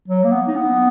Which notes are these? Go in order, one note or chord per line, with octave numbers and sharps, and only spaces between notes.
F#3
A#3
B3
D#4
B3